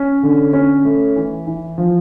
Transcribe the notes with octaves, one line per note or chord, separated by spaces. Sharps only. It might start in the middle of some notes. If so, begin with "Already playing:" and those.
Already playing: C#4
D3
C#4
A3
E3
E3
F3